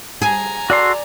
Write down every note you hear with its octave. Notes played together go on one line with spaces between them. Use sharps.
G#4 G#5 A#5
F#4 A4 D5 C6